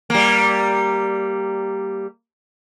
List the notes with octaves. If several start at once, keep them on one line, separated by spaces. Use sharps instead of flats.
G3 A#3